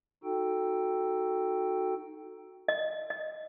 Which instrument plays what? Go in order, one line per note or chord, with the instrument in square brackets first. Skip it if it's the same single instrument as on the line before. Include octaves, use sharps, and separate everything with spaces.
[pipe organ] D#4 F#4 A4 G5
[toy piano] D#5
D#5